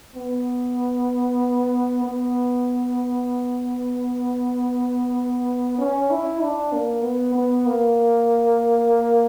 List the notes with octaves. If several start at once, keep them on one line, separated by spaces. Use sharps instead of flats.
B3
B3
C#4
E4
D4
A#3
B3
B3
A#3